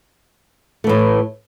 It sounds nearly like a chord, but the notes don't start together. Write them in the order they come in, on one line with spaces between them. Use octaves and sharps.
A3 E3 A2